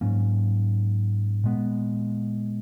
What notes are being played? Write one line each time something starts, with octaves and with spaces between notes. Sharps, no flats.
G#2 F#3 A#3 C#4
A#2 G#3 B3